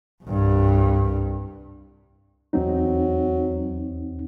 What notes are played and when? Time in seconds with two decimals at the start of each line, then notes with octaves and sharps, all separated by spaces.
0.24 C2 G2
2.53 E2 F#3 C4 D#4